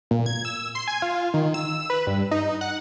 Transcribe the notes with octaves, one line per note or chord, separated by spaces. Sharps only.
A#2
G#6
E6
C6
G#5
F4
D#3
E6
B4
G2
D#4
F#5